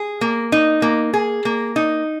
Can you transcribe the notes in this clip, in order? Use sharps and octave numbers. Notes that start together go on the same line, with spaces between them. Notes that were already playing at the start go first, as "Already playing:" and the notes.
Already playing: G#4
A#3
D#4
A#3
G#4
A#3
D#4